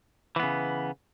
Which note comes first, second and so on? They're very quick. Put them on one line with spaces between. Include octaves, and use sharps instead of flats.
E3 B3 C#3